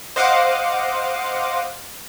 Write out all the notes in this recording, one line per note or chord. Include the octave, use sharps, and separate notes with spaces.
C5 D#5 F5 F#5 D6